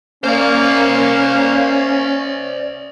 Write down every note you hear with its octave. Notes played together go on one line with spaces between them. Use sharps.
A#3 C#4 C5 D5